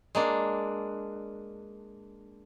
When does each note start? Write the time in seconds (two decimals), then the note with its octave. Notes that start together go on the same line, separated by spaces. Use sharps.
0.15 G#3 A#3 D4